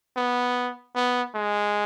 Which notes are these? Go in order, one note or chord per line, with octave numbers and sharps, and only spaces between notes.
B3
B3
G#3